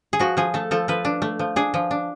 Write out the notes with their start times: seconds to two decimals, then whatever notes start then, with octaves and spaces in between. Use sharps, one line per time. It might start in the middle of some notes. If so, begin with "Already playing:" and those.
0.13 G#4
0.19 F3 F#4
0.37 F3 G#4
0.54 A3 A4
0.71 F3 A4
0.88 F3 B4
1.05 D4
1.22 A3
1.39 F3
1.56 D4 G#4
1.74 F3
1.91 D4